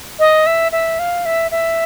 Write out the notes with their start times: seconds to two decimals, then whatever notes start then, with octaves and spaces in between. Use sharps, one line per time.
0.19 D#5
0.46 E5
0.72 E5
0.99 F5
1.26 E5
1.51 E5